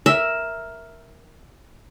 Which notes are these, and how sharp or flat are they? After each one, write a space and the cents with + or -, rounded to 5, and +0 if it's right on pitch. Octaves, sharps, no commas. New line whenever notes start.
A#4 +5 E5 +0